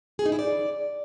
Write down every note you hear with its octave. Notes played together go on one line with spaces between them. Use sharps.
G#4
D#4
E4
D5